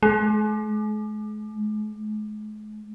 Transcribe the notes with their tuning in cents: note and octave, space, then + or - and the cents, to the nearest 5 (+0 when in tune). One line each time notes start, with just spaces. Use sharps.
G#3 +45